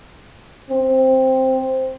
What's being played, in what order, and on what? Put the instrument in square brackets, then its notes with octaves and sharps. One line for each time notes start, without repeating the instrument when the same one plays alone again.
[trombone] C4